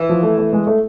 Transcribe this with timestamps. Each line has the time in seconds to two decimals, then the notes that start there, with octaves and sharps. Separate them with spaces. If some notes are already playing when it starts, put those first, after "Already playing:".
Already playing: E3
0.09 F3
0.23 A3
0.38 A3
0.53 G#3
0.67 A3